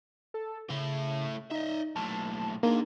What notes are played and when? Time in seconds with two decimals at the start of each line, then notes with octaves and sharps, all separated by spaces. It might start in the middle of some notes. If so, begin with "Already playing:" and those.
0.34 A4
0.70 C#3 A3 E4
1.51 D#4 D#5 E5
1.96 B1 A2 A5
2.63 A#3 D4 D#4 G#4